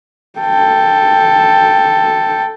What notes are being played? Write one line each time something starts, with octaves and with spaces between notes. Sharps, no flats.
A4 G5